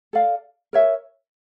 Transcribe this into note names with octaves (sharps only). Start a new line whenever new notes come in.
A4 D5 F5
A#4 C#5 E5